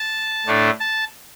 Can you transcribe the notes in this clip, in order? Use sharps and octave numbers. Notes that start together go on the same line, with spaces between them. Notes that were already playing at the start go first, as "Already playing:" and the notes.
Already playing: A5
A2 A3 D4
A5